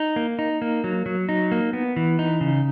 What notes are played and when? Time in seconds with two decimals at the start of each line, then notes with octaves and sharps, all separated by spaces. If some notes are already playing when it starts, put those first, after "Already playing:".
Already playing: D#4
0.16 A#3
0.39 D#4
0.62 A#3
0.84 F#3
1.06 F#3
1.29 D#4
1.52 A#3
1.73 B3
1.96 E3
2.19 D#4
2.41 C#3